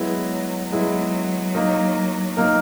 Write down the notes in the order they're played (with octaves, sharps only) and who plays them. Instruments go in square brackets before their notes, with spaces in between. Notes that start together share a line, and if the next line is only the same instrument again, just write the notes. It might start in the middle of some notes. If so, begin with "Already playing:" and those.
Already playing: [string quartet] F#3 [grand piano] G#3 B3 E4 B4
[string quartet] F#3 [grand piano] G#3 B3 E4 B4
[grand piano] A#3 D#4 A#4
A#3 D#4 A#4